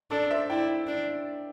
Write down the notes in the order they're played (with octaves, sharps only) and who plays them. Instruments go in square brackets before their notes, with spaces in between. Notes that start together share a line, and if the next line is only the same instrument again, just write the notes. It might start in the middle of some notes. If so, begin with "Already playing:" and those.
[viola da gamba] D4 [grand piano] A4 D5
[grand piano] D5
C5 E5
[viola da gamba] E4 [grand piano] D5 G5
[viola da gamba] D4